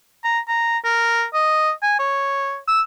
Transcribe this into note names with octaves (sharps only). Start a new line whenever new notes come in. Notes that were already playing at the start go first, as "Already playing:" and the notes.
A#5
A#5
A#4
D#5
G#5
C#5
E6